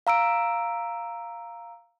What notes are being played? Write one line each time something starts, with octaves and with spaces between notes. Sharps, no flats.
F5 A#5 E6 D7